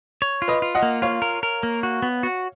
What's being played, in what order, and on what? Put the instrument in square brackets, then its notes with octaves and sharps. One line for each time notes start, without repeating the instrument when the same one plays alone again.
[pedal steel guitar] C#5
F4
[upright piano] B4 D#5
[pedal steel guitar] F4
[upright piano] D#5 F#5
[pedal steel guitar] A#3
[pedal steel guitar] F4 [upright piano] C#5 F5
[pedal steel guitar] A#4
A#4
A#3
F#4
B3
F#4